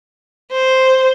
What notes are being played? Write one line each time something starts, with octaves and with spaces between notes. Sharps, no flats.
C5